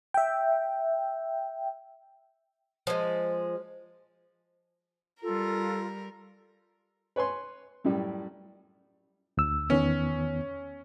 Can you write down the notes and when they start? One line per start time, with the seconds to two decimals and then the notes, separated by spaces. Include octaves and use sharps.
0.14 E5 G5
2.87 F3 G#3
5.23 G3 F4 A4 A#4
7.16 B4 C#5 G#5 C6
7.84 F#2 A2 G3
9.37 D2 E6
9.70 E2 D#3 B3 C#4